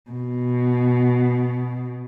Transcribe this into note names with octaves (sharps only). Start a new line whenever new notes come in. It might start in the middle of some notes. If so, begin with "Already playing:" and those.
B2